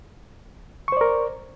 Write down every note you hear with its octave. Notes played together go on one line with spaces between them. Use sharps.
A#4 C5 D5 C#6